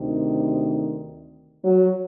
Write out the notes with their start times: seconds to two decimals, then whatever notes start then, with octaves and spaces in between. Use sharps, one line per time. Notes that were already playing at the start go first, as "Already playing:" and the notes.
Already playing: D2 C3 D#3
1.64 F#3